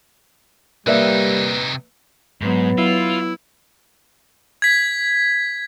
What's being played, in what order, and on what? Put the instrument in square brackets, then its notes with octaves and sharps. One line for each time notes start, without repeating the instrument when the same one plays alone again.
[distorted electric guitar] C3 D#4 [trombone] G3 [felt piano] A#3 D5 E5 [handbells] B4
[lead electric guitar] G#2 [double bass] F#3 B3
[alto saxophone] E4 [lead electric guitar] F4
[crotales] G#6 B6